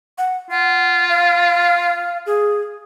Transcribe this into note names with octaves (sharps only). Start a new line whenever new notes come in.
F#5
F4 F#5
F5
G#4